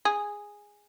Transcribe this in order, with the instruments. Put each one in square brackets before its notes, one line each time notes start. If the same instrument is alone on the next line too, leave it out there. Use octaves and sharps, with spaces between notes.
[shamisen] G#4